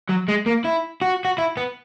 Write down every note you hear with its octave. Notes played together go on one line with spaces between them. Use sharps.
F#3
G#3
A#3
E4
F#4
F#4
E4
B3